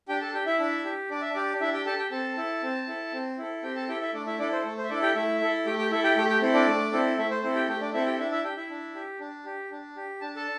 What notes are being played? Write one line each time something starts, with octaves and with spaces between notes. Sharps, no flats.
D4 G4 G5
A4 A5
G4 G5
E4 E5
D4
G4
D4 D5
E5
D4 G4 D5
D4 E4 E5
G4 G5
G4 A4 A5
G4 G5
C4 A4 A5
E4 A4
C4
E4 A4
C4
E4 A4
C4 G4 G5
A4 A5
E4 G4 A4 G5
E4 E5
A3 D4 D5
E4 E5
D4 E4 A4 D5
C5
A3 A4
C5
E5
D4 E4 A4 D5
G4 G5
A3 E4 E5
E4 A4
A3 G4 G5
G4 G5
E4 A4 E5
G4 G5
A3 G4 G5
G4 G5
C4 E4 A4
D4 D5
A3
C4 E4 A4
A3 E4 E5
C5
C4 E4 A4 C5
G4 G5
A3 G4 G5
D4 D5
C4 E4 A4 E5
G4 G5
D4 E4 E5
E4 E5
G4 G5
E4 E5
D4
G4
D4
G4
D4
G4
D4 A5
A4 A5